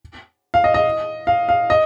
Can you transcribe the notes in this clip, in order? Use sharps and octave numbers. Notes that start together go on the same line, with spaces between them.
F5
D#5
D#5
F5
F5
D#5